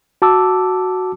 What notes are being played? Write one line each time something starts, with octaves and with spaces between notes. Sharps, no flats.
F#4 A5 D6 E6